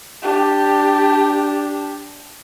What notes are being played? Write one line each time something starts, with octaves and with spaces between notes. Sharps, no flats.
D4 G4